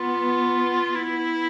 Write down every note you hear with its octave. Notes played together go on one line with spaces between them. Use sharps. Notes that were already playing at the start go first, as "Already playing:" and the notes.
Already playing: B3 F4
E4